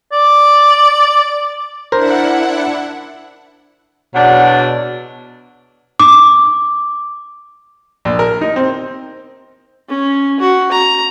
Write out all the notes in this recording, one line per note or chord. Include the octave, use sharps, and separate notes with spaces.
D5
D4 E4 A#4 C5 F#5
E2 B2 F#3 D4 F#5
D6
A#1
A#4
D#4
C4
C#4
F#4
A#5